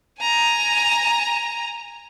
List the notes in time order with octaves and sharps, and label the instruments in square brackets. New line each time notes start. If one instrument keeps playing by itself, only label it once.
[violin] G#5 A#5